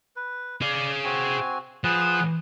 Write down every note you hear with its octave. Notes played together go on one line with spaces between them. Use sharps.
B4
G#4 D5 F5
C4 F#4 G#5
F3 G#4 B4 F#5